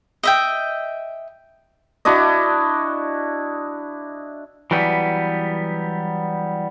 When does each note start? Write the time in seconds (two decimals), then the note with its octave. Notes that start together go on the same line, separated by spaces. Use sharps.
0.23 D#5 E5 G5
2.05 D4 E4 F#4 D#5
4.71 E3 F#3 G3 B3